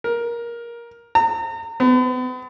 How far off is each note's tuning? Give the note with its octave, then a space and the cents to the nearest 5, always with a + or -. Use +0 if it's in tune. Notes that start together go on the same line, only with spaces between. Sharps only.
A#4 +15
A#5 -35
B3 +40